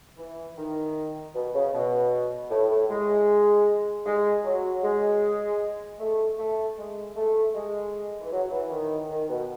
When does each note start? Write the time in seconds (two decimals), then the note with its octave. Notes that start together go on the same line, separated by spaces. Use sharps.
0.17 E3
0.56 D#3
1.34 B2
1.54 C#3
1.73 B2
2.50 A2
2.70 A2
2.89 G#3
4.05 G#3
4.44 F#3
4.83 G#3
5.99 A3
6.38 A3
6.77 G#3
7.16 A3
7.55 G#3
8.21 E3
8.32 F#3
8.52 E3
8.71 D#3
9.10 D#3
9.29 B2